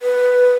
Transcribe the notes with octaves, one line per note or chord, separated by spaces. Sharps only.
B4